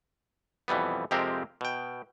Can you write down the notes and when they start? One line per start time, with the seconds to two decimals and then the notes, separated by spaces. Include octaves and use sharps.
0.68 F2 B2 E3 G3 B3
1.11 F2 C3 G#3 C4 G4 A#4
1.61 B2 G5